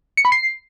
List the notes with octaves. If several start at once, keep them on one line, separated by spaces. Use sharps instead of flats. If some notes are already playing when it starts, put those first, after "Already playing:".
C#7
B5
C7